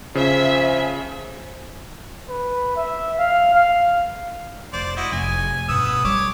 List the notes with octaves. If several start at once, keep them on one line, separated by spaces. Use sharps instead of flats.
C#3 F3 E5 G#5
B4
E5
F5
F5
F1 C5 D5
E4 F#4 D#5
F1 G#5
G2 B2 B3 D#6 E6
G3 C#5 D6